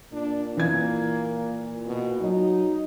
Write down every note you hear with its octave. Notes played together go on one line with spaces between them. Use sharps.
A#2 D4
E3 A#3 G#6
B2
F#3 D#4